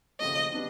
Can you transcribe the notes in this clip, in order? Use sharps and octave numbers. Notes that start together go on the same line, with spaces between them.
D#2 C#3 F3 A3 D#5
D3 G3 B3 D4